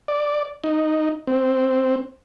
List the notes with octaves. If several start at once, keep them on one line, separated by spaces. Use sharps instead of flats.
D5
D#4
C4